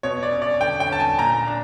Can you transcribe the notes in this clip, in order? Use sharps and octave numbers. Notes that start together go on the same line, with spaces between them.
B2 C#5
D5
C#4
D5
D3 G5
G5
C#4 A5
G#5
A#2 A#5
D4